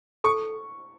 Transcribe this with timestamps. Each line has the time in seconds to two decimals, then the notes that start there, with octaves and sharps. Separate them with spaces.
0.24 A4 C#6